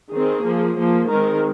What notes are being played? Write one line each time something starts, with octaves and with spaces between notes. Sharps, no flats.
D#3 C4 G#4
F3 A#3
F3 A#3
D#3 G#3 C4 A#4